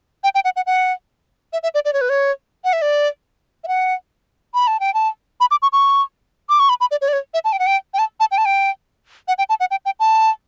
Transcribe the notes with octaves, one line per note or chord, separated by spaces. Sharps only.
G5
G5
F#5
F#5
F#5
E5
E5
D5
D5
C#5
B4
C#5
F#5
E5
D5
E5
F#5
B5
A5
G5
A5
B5
D6
C#6
C#6
D6
C#6
B5
B5
D5
C#5
D5
C#5
E5
A5
G5
F#5
G5
G5
A5
A5
G5
A5
G5
F#5
G5
A5
F#5
G5
G5
A5